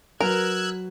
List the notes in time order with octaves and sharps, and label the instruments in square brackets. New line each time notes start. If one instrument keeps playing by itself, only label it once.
[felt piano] F#3 B4 [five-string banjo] A#4 [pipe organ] E6 F#6 G#6